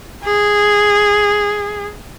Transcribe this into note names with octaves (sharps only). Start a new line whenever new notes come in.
G#4